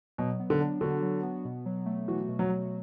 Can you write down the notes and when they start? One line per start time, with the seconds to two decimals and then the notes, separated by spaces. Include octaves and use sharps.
0.18 B2 F#3
0.40 B3
0.50 D3
0.60 D4
0.81 D3 F#4
1.02 F#3
1.23 B3
1.45 B2
1.66 F#3
1.86 A3
2.08 E3 F#4
2.28 B2
2.39 F#3
2.49 F#3